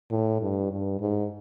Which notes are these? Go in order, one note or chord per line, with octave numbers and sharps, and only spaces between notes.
A2
G2
G2
G#2